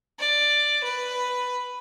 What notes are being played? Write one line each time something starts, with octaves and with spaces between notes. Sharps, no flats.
D5
B4